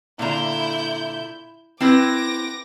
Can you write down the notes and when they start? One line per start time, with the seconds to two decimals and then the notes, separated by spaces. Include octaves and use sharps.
0.19 A#2 D3 E4 A#5 G6
1.80 C4 E4 B4 D6 A#6